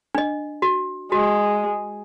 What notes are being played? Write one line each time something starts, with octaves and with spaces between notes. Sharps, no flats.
D4 D#5
F#4
G#3 F#4